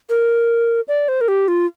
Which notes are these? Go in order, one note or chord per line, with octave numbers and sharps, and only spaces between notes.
A#4
D5
C5
A#4
G4
F4